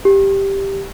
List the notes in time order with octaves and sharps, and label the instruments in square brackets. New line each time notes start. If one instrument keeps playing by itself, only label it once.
[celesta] G4